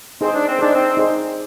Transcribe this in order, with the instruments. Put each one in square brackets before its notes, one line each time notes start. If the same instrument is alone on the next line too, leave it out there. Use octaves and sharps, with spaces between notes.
[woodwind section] C4 [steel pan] D#4 G#4 C5
[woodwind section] D4
C4
[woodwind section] D4 [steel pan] D#4 G#4 C5
[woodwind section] C4
[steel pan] D#4 G#4 C5